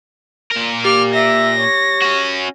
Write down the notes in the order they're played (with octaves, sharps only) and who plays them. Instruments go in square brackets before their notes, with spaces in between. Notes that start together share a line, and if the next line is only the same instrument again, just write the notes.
[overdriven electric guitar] A#2 A#4
[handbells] G4 [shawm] D6 [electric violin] F6
[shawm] E5 [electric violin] A#6
[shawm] C#5
[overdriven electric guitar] C#4 F#4